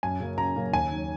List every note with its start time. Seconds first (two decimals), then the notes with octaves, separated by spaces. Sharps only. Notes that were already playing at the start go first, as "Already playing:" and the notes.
0.03 F#2 G#5
0.20 C#3 F#3 A#3
0.37 F#2 A#5
0.56 C#3 F#3 A#3
0.73 D#2 G#5
0.91 D#3 F#3